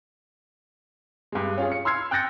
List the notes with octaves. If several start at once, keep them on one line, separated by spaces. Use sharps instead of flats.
G2 G#3
C#4 F4 G#4
C#7
C6 E6 F6 G#6 C7
G5 F#6 G6 A6 A#6 C#7